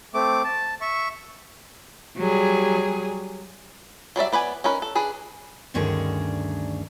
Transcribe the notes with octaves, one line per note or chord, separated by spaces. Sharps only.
A3 C4 D6
A5
E5 C#6
F#3 G3 G#4
F#3 G3 D5 E5
B3 B4 D5 G#5
C#4 D#4 A#4 B4
A4
D4 G#4 B4
D2 G2 D3 D#3 C#4 G#4